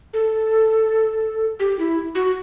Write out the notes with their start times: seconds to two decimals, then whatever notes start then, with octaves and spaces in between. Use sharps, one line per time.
0.13 A4
1.60 G4
1.79 E4
2.15 F#4